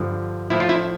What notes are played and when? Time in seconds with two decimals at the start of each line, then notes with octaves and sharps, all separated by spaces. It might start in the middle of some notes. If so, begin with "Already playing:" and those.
Already playing: G2 D3 F3
0.50 A2 F3 E4
0.60 F4
0.69 E4